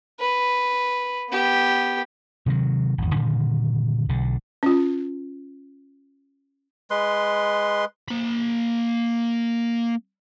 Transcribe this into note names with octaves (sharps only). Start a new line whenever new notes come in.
B4
B3 G4
C3 D#3 F3 F#3
G#1 E2
G2 A#2 D3 D#3
B1 D3
C#4 F4
G#3 B4 C6
A#3 B5